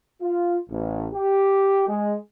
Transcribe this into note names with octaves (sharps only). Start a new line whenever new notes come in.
F4
A1
G4
G#3